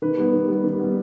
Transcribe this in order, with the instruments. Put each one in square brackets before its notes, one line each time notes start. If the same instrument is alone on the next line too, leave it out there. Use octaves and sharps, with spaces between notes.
[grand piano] D#3 B4
G3 B3
D#3
G3 B3
D#3
G3 B3